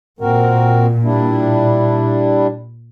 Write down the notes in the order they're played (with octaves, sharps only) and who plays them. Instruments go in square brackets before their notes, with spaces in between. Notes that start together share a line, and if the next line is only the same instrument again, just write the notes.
[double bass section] A#2 [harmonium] C4 F#4 A#4
[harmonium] G3 D4 E4